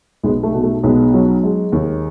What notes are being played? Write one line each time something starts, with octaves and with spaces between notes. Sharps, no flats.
B1 G#3 B3
A3
B2
A3
B1 G#3 B3
F#3
G#3
D#2